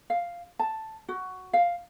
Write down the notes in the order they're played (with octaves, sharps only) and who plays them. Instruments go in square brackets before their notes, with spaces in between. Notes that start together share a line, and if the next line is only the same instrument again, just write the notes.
[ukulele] F5
A5
F#4
F5